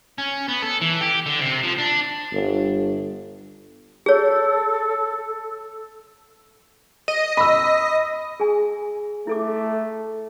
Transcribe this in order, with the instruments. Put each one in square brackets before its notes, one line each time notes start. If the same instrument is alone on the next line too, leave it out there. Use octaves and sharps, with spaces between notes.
[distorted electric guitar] C#4
B3
A4
E3
G4
D3
C3
F3
D4
[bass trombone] G1
[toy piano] G#4 C#5 [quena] A4
[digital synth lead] D#5
[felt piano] B5 E6
[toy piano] G#4 G#5
[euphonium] A3 [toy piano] E4 A4 D6